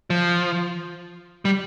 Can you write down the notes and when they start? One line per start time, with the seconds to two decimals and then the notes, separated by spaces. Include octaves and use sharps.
0.10 F3
1.45 G3